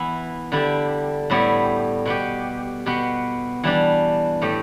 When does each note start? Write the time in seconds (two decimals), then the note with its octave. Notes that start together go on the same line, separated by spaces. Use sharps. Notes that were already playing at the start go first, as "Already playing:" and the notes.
Already playing: E3 B3 E4
0.52 D3 G3 E4 G4
1.30 A2 G3 B3 E4 G4
2.05 B2 B3 G4
2.86 B2 B3 G4
3.64 E3 G3 D4
4.42 A2 A3 G4